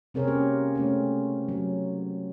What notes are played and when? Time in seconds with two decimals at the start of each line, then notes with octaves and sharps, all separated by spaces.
0.14 C3 C4 G#4 A#4 C#5
0.28 A#3 C#4 G4
0.75 A3 C4 C#4
1.48 F#3